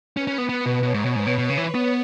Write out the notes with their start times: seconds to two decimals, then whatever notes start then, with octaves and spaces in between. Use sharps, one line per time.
0.17 C#4 B4
0.27 C#4
0.38 B3
0.49 B3 B4
0.66 B2
0.82 B2 C#5
0.94 G#2
1.05 B2
1.16 G#2 B4
1.27 B2
1.38 B2
1.50 C#3
1.57 E3
1.75 B3